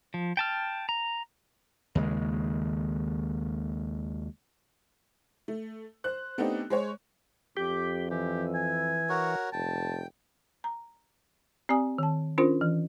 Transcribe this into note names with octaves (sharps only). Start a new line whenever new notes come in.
F3
G5 A5 F6
A#5
D#2 C#3 G#3
A3
C5 F#6
A3 B3 C4 D4 D#4 G4
G#3 C5 C#5
F2 G4 D6
E3 G4
G#5
F#4 A#4 C#5
F1 G5 A5
A#5
C4 G4 D5 G#5 D#6
D#3 A5
C#4 D4 F4 A#4 C5
E3